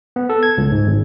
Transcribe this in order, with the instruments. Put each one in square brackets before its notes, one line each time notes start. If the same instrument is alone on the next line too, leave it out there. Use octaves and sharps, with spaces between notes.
[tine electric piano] B3
A4
G#6
C#2
G#2
G#1